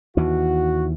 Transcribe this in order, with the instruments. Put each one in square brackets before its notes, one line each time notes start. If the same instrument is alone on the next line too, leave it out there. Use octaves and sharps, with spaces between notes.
[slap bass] D#2 E3 [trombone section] F#4